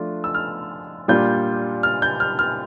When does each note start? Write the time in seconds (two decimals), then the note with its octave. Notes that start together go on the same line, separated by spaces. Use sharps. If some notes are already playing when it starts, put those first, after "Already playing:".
Already playing: F3 A3 D4 F4
0.24 E6
0.35 F6
1.08 A#2 G3 D4 F4 G6
1.83 F6
2.02 G6
2.20 F6
2.39 F6